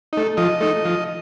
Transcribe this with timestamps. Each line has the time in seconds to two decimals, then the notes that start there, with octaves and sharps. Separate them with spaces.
0.13 A3 D#4
0.37 F3 D#5
0.60 A3 D#4
0.85 F3